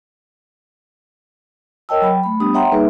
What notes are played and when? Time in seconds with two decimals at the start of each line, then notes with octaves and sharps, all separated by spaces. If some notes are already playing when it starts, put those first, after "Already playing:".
1.89 A#4 C#5 D#5 G5 A5 E6
2.02 F#3 G5 B5
2.23 A3 B5
2.40 G3 B3 D4 G4 B5 D#6
2.54 C#5 E5 F#5 G5 A#5 C6
2.72 G3 A#3 D#4 G#4 B4 E5